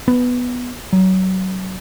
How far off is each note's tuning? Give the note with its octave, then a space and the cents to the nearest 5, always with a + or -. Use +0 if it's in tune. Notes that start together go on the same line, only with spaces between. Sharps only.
B3 +0
F#3 +25